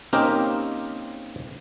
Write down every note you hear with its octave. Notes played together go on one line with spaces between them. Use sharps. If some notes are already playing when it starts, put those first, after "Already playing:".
A#3 C4 C#4 D#4 G4 A#4